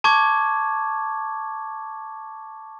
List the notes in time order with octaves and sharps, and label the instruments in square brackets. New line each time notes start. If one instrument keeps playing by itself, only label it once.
[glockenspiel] A5 C#6 D6 G#6